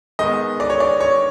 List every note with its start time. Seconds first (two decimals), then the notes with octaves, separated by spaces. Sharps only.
0.19 D#3 G#3 B3 D#5
0.60 D5
0.70 C#5
0.80 D5
1.00 C#5